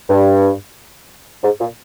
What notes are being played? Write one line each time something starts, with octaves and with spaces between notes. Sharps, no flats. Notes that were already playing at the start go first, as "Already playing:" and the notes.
G2
G#2
A#2